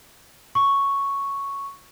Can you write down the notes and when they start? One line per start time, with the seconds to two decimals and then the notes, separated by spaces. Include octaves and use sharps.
0.55 C#6